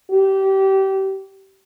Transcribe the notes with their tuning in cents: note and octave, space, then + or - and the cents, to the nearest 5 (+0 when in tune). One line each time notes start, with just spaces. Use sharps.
G4 -25